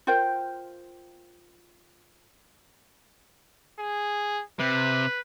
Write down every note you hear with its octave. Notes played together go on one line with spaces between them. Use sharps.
F4 A#4 C5 G5
G#4
C3 B4